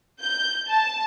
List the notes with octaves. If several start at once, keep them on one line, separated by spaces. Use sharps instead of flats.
G6
A5